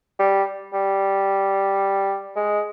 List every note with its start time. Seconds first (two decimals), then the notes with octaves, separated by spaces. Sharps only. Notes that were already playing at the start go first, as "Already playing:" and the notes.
0.19 G3
0.73 G3
2.36 G#3